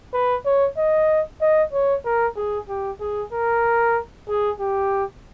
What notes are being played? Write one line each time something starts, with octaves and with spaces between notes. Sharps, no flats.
B4
C#5
D#5
D#5
C#5
A#4
G#4
G4
G#4
A#4
G#4
G4